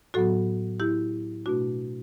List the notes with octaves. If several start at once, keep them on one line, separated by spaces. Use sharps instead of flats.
A2 F#3 B3 F#4 A4
E4 G4
B2 A3 D4 F#4